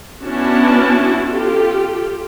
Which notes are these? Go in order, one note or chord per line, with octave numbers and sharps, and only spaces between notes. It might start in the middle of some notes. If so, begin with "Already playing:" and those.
B3 C#4 D4 E4 F#4 A5
F4 G4 A4